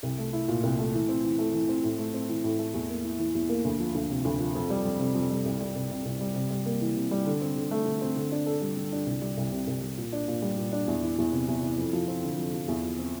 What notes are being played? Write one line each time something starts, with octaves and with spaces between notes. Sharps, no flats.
C2
A3
E4
A#2
C2
A3
E3
C4
E3
A3
E3
C4
A2
A3
C4
E3
A2
A3
E2
A#3
E4
E3
E2
A#3
D2
F3
D2
C3
D2
F3
F2
G3
F2
C3
F2
G3
C2
G3
C2
C3
C2
G3
C3
G3
A#3
E3
C3
G3
D3
C4
D3
A3
D3
C4
D3
D4
A4
G3
D3
D4
C2
G3
C2
C3
C2
G3
A#2
D4
A#2
G3
A#2
D4
E2
E3
E2
C3
E2
E3
F2
F3
C4
D3
F2
F3
E2
F3
C4